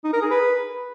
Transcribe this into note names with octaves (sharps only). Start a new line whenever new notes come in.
D#4
A#4
G#4
B4